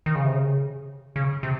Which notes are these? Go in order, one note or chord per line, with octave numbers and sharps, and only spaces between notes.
D#3
C#3
C3
C#3
C#3
C3